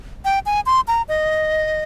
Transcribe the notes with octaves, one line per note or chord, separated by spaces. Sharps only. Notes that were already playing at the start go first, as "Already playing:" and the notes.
G5
G#5
C6
A#5
D#5